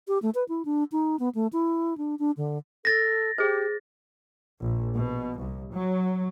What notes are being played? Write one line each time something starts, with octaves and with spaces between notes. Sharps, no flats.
G4
A3
B4
E4
D4
D#4
B3
A3
E4
D4
D4
D3
A4 A6 A#6
G4 G#4 C5
A#1
B2
C2
F#3